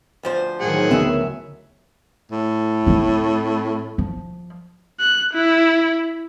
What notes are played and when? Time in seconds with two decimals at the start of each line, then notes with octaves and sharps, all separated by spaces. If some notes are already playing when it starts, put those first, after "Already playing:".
0.23 D2 F3 C5
0.61 A2 D#3 F#3 G#4 F#5
0.91 D2 C#3 B3 E5 G#5
2.32 A2
2.87 C4 E4
3.98 F3
5.00 F#6
5.34 E4